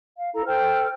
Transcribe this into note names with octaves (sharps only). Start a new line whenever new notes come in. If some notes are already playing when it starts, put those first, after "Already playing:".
F5
E4 A4 A#5
A4 C5 G5 F6